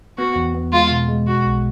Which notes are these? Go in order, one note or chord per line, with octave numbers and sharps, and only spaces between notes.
B3 F#4
E2
B3
G#3 F4
B2
G#3
B2 F#4
B1